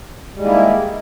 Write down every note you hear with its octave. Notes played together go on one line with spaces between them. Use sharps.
D#3 G3 G#3 A#3 E4